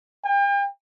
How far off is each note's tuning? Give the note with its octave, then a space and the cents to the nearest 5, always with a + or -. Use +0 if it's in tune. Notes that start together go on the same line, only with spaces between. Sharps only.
G5 +40